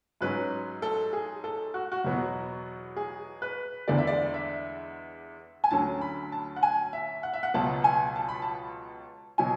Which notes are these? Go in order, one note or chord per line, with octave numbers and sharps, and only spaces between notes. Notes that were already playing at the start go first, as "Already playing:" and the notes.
G#2 F#3 C#4 B4
A4
G#4
A4
F#4
F#4
E2 B2 F#3 B3
G#4
B4
E2 D3 G#3 B3 D5
E5
D5
E5
G#5
D2 D3 F#3 C#4 A5
B5
A5
F#5
G#5
E5
F#5
E5
F#5
C#2 B2 F#3 B3 A5
G#5
A5
B5
A5
B2 F#3 G#5